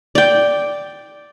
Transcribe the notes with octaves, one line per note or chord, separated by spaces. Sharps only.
D5 G5